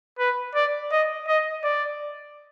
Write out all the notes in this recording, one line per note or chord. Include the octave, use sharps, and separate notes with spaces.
B4
D5
D#5
D#5
D5